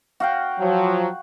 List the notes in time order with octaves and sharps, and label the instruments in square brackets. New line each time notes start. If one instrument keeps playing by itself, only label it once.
[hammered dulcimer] F#4 F5 G5
[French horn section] F3 F#3